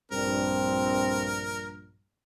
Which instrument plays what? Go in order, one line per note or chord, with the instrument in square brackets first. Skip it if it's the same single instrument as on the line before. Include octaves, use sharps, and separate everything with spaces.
[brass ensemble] A#1 G2 [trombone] C4 [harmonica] A#4